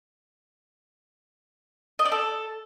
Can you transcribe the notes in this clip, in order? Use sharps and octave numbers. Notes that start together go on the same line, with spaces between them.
D#5
D5
A4